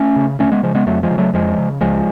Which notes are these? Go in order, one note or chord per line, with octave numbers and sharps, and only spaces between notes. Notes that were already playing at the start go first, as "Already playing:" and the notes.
Already playing: A3 C#4
C#3
D2 A3 C#4
G#3 B3
C#3 F3 G#3
G#3 B3
F2 F#3 A3
F3 G#3
C#3
F#3 A3
F2 F3 G#3
C#3
C#2 F3 G#3